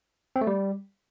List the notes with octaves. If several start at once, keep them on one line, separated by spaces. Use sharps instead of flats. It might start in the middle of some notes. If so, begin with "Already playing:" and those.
C4
A3
G3